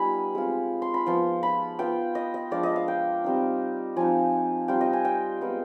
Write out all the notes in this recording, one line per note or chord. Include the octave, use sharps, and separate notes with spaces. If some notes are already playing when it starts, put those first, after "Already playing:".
Already playing: G3 B3 D#4 F4 G#5 B5
G#3 C4 F4
C6
B5
F3 B3 F4 C6
B5
B3 F4 G5
D#5
D#5
F3 G#3 D4 F4 D5
D#5
F5
G5
G3 C4 D#4
F3 C4 D#4 G#5
G3 C4 F4 G5
D#5
G#5
G5
G#3 B3 F4